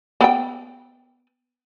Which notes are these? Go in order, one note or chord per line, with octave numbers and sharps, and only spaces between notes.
B3 B4 G5